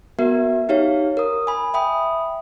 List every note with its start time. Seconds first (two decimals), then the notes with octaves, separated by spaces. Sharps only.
0.19 B3 F#4 A#4 E5
0.69 D#4 G4 C#5 F5
1.17 A#4 D#6
1.47 G#5 B5
1.74 E5 G5 B5 D#6